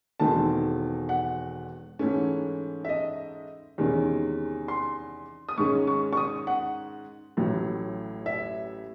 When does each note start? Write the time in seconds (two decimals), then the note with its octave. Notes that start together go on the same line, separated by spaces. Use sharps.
0.20 E1 E2 D#3 A3 C4 A5
1.09 F#5
1.99 G#2 E3 A3 C#4
2.85 E5
2.89 D#5
3.78 E2 C3 D#3 G#3 C#4
4.68 C6
5.49 D#6
5.58 G#2 D#3 G#3 C#4 C#6
5.87 C#6
6.13 C#6
6.17 D#6
6.47 F#5
7.37 A1 A2 F#3
8.26 E5